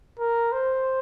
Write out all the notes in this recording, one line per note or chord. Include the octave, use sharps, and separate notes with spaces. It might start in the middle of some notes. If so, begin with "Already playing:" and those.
A#4
C5